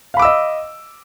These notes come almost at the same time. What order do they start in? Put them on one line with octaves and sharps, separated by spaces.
F5 B5 D6 E6 D#5